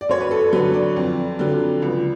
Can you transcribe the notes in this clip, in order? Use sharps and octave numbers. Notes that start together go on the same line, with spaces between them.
D5
F#2 C#5
B4
A4
D3 F#3 B4
D5
F2
D3 F#3
C#2